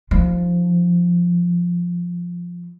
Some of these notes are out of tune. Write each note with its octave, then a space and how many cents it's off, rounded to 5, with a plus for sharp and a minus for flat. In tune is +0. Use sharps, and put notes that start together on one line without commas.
F3 +0 D#4 +0